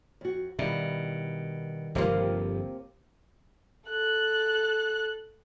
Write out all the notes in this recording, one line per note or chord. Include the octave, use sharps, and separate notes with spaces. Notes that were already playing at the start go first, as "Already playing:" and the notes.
F2 F#4
B2 D#3 G3 E4 F5
G1 C3 F3 A#3 F4
A4 F#6